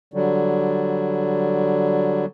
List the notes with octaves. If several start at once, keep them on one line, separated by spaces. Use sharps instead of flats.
D3 F#3 G3